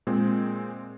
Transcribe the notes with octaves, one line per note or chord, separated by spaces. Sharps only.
A#2 G#3 C4